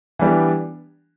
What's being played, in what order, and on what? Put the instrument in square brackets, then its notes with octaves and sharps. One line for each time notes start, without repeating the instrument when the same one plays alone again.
[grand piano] E3 G3 B3 D4 G4